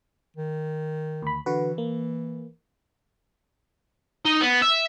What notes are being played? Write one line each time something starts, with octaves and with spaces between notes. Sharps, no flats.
D#3
D2 B5
D3 E3 F#4 B4
A#3
D#4
B3
E5